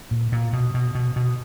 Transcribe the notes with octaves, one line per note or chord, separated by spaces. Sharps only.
A#2
A#2
B2
B2
B2
B2